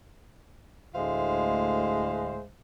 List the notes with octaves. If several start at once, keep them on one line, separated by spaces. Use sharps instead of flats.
D2 A2 G#3 C5 E5 F5